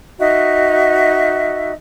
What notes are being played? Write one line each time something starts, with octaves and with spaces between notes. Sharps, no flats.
D#4 F#4 D#5 E5